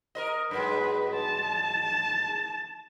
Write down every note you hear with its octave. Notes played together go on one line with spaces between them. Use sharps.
A#4 B4 D#5
G2 F#3 G#3 B4
A5